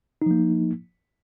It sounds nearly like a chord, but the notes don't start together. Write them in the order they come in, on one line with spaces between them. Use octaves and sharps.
D#4 F3 A#3